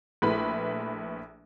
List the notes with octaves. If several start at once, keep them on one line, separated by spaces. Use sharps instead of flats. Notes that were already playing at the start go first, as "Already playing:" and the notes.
A#1 A3 E4 B4 B5